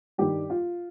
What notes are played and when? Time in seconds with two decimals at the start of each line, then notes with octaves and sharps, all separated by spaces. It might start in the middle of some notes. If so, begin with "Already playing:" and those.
0.18 G2 D#3 G3 G4
0.50 F4